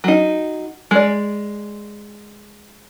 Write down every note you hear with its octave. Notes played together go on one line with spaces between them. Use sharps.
F#3 D#4
G#3 D5